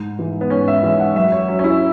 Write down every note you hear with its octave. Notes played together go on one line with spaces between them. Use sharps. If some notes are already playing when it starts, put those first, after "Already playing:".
Already playing: G#2
E3 G#3
B3
G#2 C#4
E5
E3 G#3 E5
F#5
F#2 E5
C#5
F#3 C#4
C#4
E4